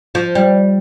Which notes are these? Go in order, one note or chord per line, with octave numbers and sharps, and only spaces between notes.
F3
G3